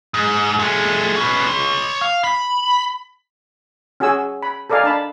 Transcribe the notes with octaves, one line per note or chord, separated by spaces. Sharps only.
G#2
G#3 A3
C#4 B4
C#5 C6
F5
B5
C#4 F#4 G#4 G#5 E6
B5
A4 A#4 D5 D#5 F5 G#5
D4 A5 B5